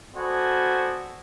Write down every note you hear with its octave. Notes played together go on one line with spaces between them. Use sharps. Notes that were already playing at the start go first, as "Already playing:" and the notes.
B3 F#4 A4 C5 D5 G#5